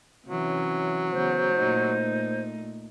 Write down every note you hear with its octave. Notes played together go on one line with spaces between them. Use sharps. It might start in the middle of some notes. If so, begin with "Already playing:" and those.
C3 E3 F#3 C#4
C#3 E3 B3 C5
A#2 A3 D#4